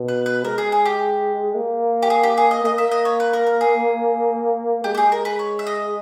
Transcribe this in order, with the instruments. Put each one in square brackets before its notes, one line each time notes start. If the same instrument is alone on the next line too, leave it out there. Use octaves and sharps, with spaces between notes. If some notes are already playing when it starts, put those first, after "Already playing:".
Already playing: [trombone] B2
[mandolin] B4
B4
[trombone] G#3 [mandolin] A#4
[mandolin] G#4
G#4
G4
[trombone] A#3
[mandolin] G4
G#4
G4
G#4
D#5
[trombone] A#3 [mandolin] D#5
[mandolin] E5
D#5
C#5
B4
A#4
A#4
G#4
[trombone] G#3 [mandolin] G4
[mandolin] G4
G#4
A#4
B4
C#5
E5
D#5